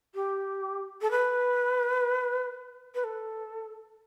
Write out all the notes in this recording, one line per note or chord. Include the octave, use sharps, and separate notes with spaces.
G4
A4
B4
B4
A4